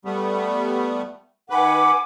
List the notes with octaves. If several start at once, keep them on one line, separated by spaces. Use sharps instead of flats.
G3 A3 B3
D#3 B4 F#5 G#5 D6